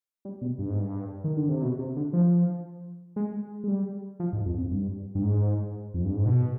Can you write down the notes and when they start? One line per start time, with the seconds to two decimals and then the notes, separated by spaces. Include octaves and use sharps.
0.25 G3
0.42 B2
0.59 G2
0.69 G#2
0.79 G2
1.24 D#3
1.37 D3
1.49 C3
1.63 B2
1.79 C3
1.96 D3
2.13 F3
3.16 G#3
3.64 G#3
3.68 G3
4.20 F3
4.33 G#2
4.46 F2
4.58 F2
4.71 G2
5.15 G2
5.23 G#2
5.94 F2
6.05 G2
6.15 G#2
6.26 B2